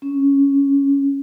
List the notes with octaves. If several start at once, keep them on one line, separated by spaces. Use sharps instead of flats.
C#4